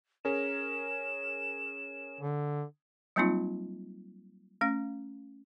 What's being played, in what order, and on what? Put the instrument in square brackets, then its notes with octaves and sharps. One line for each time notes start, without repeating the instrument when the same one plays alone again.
[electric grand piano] C#4 G#4 A#4 [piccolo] E7
[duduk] D3
[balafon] F#3 G3 A#3 C4 D#4 F4
A3 C#4 F5